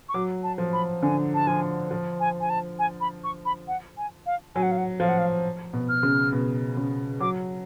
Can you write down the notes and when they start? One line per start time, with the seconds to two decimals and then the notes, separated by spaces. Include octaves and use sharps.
0.09 C#6
0.14 F#3 D6
0.43 A5
0.58 F3
0.73 B5
1.02 D3 G#5
1.35 A5
1.47 F3 G#5
1.91 F3
2.20 G#5
2.41 G#5
2.50 A5
2.79 G#5
3.01 B5
3.24 C#6
3.45 B5
3.68 F#5
3.98 G#5
4.26 F5
4.55 F#3 G#5
4.63 F#5
4.71 F5
4.78 F#5
5.00 F3 F5
5.09 F#5
5.18 F5
5.73 B2
5.89 F6
6.03 C#3
6.33 B2
6.77 C#3
7.20 F#3 D6